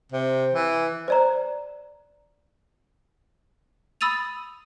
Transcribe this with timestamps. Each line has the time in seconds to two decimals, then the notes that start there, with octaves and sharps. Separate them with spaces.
0.12 C3
0.54 E3
1.08 C5 D5 A#5
4.01 B5 D#6 E6 A6 D#7 F7